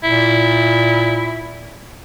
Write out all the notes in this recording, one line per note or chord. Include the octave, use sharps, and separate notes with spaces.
A#2 E4